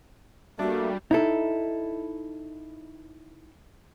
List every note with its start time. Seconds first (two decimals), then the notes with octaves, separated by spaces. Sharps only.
0.59 G3 A3 A#3 D4 F#4
1.11 D#4 E4 A4